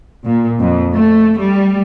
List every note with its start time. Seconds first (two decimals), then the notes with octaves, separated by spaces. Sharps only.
0.25 A#2
0.61 F2
0.94 A3
1.39 G3